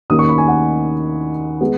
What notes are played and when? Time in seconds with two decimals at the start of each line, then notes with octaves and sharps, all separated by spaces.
0.10 D#2 D#3 A#3 C#4 D#6
0.19 C#6
0.29 B5
0.38 G#5
0.48 F#5
1.61 G#3 B3